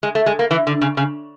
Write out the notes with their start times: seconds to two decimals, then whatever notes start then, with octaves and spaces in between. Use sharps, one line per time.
0.03 G#3
0.15 A3
0.26 G#3
0.39 A#3
0.51 E3
0.67 D3
0.81 C#3
0.97 C#3